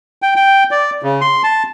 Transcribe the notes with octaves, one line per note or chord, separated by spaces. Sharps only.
G5
G5
D5
C#3
C6
A5